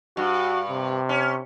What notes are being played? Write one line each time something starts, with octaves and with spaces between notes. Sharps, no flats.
G2 F#4
C3
C#4